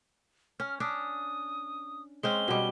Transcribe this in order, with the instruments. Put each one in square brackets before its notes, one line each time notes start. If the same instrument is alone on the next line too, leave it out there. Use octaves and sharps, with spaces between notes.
[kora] C#4 [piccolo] F6
[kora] C#4 D4 [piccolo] D#6
[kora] G#3 C4 C#4 [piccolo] G7
[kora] B2 G3